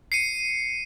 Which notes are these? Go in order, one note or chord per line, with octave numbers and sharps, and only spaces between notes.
C7 C#7 D#7